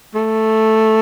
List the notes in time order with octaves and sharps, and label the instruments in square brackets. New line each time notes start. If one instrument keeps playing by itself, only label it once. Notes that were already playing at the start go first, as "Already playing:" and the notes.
[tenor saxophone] A3